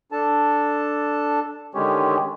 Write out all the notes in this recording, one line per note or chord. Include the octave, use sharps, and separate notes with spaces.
D4 A4 A5
D3 D#3 G#3 C#4 G4 C#5